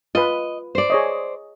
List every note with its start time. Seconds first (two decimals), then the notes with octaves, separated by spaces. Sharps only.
0.15 F4 B4 D#5
0.75 C5 D5
0.90 G#4 C#5 D#5